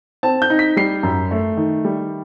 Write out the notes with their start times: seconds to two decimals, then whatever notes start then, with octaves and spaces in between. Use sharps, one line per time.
0.23 C4 A5
0.42 G6
0.50 D#4
0.59 B6
0.77 G3 C7
1.03 F#2
1.31 A3
1.57 D#3
1.85 G3